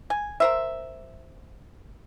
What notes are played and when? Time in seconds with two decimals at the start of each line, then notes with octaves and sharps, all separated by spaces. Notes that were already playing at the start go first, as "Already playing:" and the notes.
0.10 G#5
0.40 A#4 C5 E5